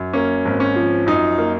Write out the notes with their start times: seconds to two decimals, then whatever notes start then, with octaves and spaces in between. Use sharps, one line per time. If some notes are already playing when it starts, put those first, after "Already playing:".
Already playing: F#2
0.13 A#3 C#4
0.45 G#1
0.60 C#4
0.76 F3
1.07 F#2 D#4
1.38 A#3